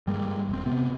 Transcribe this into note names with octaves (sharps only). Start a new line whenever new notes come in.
G2 G3 G#3 A#3
E1 C4
C3 B3 C4